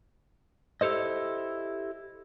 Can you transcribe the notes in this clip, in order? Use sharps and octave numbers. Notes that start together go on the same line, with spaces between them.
E4 G4 A4 C5 D#5